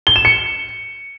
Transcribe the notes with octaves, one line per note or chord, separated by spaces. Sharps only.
G7
E7
C#7